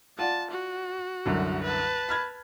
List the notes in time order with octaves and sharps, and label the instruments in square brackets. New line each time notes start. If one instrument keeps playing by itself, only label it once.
[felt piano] F4 D5 F#5 [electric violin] A5
[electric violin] F#4
[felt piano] C2 F#2 D3
[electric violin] B4 A5
[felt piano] B5 F6 G#6